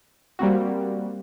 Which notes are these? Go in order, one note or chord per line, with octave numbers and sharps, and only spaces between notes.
G3 A#3 C4 F#4